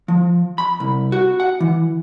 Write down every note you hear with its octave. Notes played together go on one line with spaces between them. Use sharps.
F3
B5
C2
F#4
F#5
E3